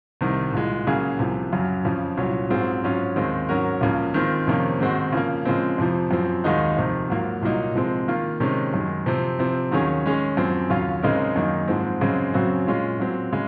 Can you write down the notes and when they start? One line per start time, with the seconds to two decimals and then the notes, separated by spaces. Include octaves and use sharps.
0.21 C2 C3 D#3
0.53 C2 A#2 G#3
0.87 C#3 F#3 A#3 C#4 G#4
1.19 C2 C3 F3
1.52 F#2 C#3 F#3
1.85 F2 C#3 F3
2.17 C2 A#2 F#3 C#4
2.50 G#2 F#3 C4 F4 G#4
2.83 G#2 F#3 C#4 F4
3.16 D#2 D#3 G#3 C4
3.49 G#2 F#3 C#4 F#4 A#4
3.81 C#2 C#3 F3 A#3
4.14 D#3 G#3 C4 F4
4.47 F2 C3 D#3 A#3 C#4
4.80 G#2 D#3 G#3 C4 F#4
5.12 C#3 F3 A#3
5.45 C#3 F3 G#3 C4
5.78 F2 C3 F3
6.11 F#2 F3 C4
6.44 D#2 D#3 G#3 D#4 F#4
6.77 F2 C3 D#3
7.09 G#2 F#3 A#3 F4
7.42 C2 A#2 F#3 A#3 D#4
7.75 C3 F3 G#3 C4
8.08 D#3 A#3 F4
8.40 C3 D#3 G#3 C#4
8.74 F#2 D#3 G#3
9.06 C3 F3 C4
9.39 C3 F3 C4
9.72 D#2 D#3 F#3 C#4 G#4
10.05 D#3 G#3 C#4 G#4
10.37 F#2 F3 C4
10.70 D#2 C#3 F#3 C#4 F4
11.03 C#3 G#3 C4 D#4 A#4
11.36 F#2 D#3 A#3 D#4
11.68 G#2 F3 G#3 C4
12.01 F#2 C#3 G#3 C4
12.34 F#2 C#3 F#3 C4 F#4
12.67 A#2 G#3 C#4 F4
12.99 A#2 F#3 C4
13.33 C#3 G#3